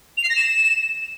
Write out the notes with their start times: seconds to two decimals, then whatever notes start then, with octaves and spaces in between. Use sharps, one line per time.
0.17 F7
0.23 C7
0.29 A#6
0.35 E7